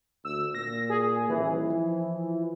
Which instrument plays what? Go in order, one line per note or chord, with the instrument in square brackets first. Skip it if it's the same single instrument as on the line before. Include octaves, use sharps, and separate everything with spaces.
[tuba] D2 [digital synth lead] E6
[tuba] A#2 [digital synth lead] A#6
[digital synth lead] G#4
[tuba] D#1 [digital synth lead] E3
[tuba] F3